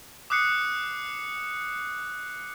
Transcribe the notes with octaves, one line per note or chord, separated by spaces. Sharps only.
D6 D#6 F#6 C7 C#7